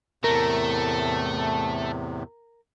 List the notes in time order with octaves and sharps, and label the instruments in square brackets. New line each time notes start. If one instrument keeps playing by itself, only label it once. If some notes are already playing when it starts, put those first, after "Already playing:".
[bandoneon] E2 A2 C3 [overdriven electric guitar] A3 [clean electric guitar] A#4